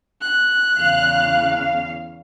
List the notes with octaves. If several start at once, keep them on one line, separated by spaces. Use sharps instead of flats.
F#6
E2 C#3 F5